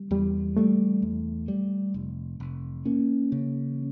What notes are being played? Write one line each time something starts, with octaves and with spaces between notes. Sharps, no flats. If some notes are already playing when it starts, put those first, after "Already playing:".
Already playing: G3
E2 G3
G3 A3
E2
G3
F1
F1
A#3 C#4
C#3